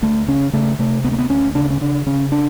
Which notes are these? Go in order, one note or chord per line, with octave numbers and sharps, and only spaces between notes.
D2 A3
C#3 C#4
C#3 A3
C3 A3
D2 B3
A#3
B3
D2 C#4
C#3 D4
C#4
C#3 D4
C#3 C#4
D4